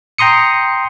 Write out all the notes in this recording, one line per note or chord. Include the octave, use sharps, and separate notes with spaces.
G5 A#5 C6 D#6 C#7